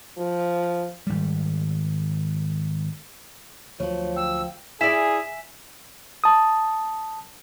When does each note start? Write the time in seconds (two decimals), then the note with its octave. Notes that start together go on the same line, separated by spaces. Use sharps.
0.17 F3
1.07 G#1 G3
3.80 D2 F3 F#3 C#5
4.16 G5 E6
4.81 E4 G#4 D5 E5 G#5 B6 E7
6.24 A5 D#6